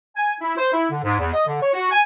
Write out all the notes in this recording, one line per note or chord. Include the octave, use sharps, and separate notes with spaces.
G#5
E4
C5
E4
D3
G#2
E2
D#5
D3
C#5
F#4
G#5